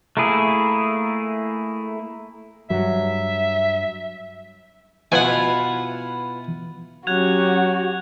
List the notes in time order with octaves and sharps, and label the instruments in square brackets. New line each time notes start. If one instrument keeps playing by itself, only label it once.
[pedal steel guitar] A3 A#3 E4 G#4
[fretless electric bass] G2 F#3 [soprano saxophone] E5
[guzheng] B2 [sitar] E4 F4 B4 [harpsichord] F#5 G#5
[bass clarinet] F#3 [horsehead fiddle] C#4 G4 [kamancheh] F#4 [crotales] F#6 G#6 F7